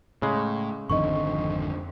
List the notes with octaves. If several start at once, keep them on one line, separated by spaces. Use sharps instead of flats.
A2 C#3 G#3
G#1 F2 D3 D#3 D#5 C#6